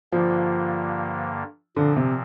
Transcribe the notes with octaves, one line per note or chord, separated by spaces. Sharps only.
G2 D3 F3 A#3
A#2 D3 F3 C4
C3